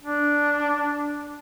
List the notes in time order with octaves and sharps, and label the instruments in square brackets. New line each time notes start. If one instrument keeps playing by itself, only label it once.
[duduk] D4